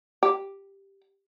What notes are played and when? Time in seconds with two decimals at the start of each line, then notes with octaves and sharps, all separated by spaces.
0.23 G4